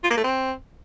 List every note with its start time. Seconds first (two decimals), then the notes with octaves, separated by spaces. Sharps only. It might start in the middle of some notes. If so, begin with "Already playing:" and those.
0.04 F4
0.10 A#3
0.17 A3
0.24 C4